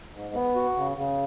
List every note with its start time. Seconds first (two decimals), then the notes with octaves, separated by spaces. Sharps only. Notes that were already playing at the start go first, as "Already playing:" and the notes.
0.14 G#2
0.35 B3
0.55 F#4
0.76 C#3
0.97 C#3